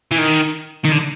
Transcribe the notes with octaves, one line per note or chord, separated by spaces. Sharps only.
E3
D#3
D#3
D3